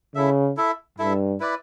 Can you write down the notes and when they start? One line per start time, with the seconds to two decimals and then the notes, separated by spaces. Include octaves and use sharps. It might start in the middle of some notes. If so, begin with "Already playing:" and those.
0.15 C#3 E4 A4 E5
0.57 E4 A4 E5
0.98 G2 E4 A4 E5
1.40 E4 B4 D5